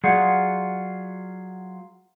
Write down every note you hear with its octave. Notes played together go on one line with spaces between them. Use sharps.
F#3 G3 F4 G#4 F#5